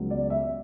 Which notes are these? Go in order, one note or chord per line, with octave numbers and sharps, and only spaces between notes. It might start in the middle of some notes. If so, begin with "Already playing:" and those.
Already playing: C#2 C#3 F#3 B3
D5
E5